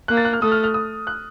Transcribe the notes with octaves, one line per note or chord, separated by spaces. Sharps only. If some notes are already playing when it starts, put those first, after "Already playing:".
A#3 F#6
A6
F#6
F6
A3 D#6
F6
F6
D#6
F#6